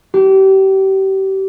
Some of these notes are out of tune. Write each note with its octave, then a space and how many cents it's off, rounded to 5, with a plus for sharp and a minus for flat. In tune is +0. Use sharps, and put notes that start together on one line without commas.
G4 -30